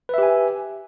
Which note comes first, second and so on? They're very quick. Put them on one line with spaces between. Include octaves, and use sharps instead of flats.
B4 E5 G4 G#5